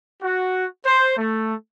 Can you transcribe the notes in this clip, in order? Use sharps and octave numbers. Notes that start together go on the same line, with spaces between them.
F#4
C5
A3